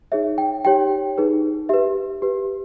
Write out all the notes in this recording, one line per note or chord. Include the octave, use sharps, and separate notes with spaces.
D#4 G#4 C#5 E5
G5
D#4 G4 C#5 G5
D#4 G#4 B4
G4 B4 E5
G4 B4